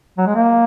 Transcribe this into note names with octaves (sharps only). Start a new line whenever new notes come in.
F#3
G#3
A#3